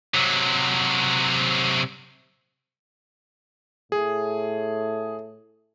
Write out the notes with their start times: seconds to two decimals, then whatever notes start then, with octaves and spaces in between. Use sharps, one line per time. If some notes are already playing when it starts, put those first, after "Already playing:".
0.14 C3 F#3
3.92 A2 G#4